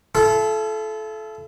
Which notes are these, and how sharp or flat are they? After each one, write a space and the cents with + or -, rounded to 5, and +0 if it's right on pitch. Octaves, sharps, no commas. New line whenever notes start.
E4 +45 A4 -25